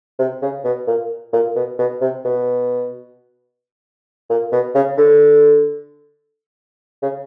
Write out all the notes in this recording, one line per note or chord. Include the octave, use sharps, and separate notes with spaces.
C3
C#3
B2
A#2
A#2
B2
B2
C3
B2
A#2
B2
C#3
D3
C#3